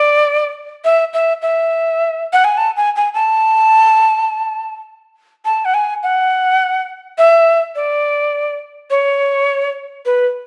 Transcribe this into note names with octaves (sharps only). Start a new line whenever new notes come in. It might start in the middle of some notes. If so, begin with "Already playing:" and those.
Already playing: D5
E5
E5
E5
F#5
G#5
A5
G#5
G#5
A5
A5
F#5
G#5
F#5
E5
D5
C#5
B4